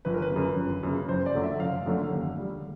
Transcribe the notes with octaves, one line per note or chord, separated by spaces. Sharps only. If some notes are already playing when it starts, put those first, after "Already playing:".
G1 B4
A#4
B4
F#2 C#3
G1
F#2 C#3
F#1 C5
D5
F#2 D3 F#3 A3
E5
F#1 F5
F#2 D3 F#3 A3
D#2
D3 G3